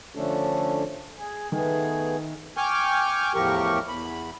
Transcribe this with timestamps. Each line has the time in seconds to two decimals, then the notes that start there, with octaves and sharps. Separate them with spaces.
0.15 D3 F3 A3 C#4 D4 A4
1.18 G#4
1.52 D#3 A3 B3 G#4
2.57 G5 G#5 C#6 D6 F6 G6
3.35 E2 A2 F3 G4 A#4 C#6
3.88 E2 B5